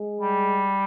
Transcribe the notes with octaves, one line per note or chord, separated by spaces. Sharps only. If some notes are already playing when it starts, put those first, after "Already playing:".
Already playing: G#3
G3